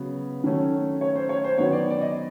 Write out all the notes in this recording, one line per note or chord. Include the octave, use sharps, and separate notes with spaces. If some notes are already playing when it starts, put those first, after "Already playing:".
Already playing: C#3 F#3 B3
D#3 F#3 A3 C#4
C#5
C5
C#5
C5
D#3 F#3 B3 C#5
D5
D5
D#5